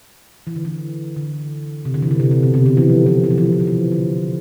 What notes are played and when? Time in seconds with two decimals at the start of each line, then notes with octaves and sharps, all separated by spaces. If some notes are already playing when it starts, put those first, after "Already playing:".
0.47 E3
0.56 D3
0.65 E3
1.16 D3
1.85 C3
1.94 D3
2.02 E3
2.11 D3
2.20 C3
2.31 C3
2.43 B2
2.54 C3
2.66 D3
2.77 E3
2.89 F3
3.06 E3
3.24 E3
3.31 F3
3.38 E3
3.46 F3
3.52 E3
3.60 F3
3.67 E3
3.92 D3